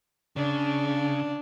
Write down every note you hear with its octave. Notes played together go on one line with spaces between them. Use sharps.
C#3 D4